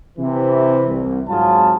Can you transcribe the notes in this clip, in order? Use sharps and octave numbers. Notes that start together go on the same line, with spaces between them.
C3 E3
C2
G#1 G#2 F#3 F4 G#4 A5